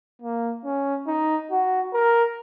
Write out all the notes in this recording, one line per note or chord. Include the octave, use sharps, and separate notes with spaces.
A#3
C#4
D#4
F#4
A#4